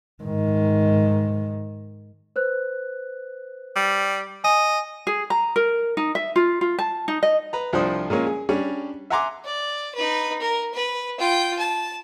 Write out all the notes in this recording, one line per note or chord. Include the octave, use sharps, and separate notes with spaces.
G#2 D#3
B4 C5 F#6
G3
D#5 G#5
G#4
A#5
A#4
D#4
E5
F4
F4
A5
D#4
D#5
B4 A#5
C2 F3 D4 C5 D#6
A#2 G#3 A#3 C#4
G#4
G3 C#4 D4
E5 F#5 G#5 A#5 C6 D6
D5
D#4 B4
A#4
B4
F4 G5
A5